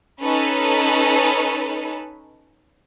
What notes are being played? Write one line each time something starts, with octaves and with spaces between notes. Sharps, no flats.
C#4 D#4 A4 B4